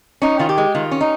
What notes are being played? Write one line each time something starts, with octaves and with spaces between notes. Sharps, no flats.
C#4 D#4
D#3 F4
G4
G#3
D#3 F4
C#4
D#4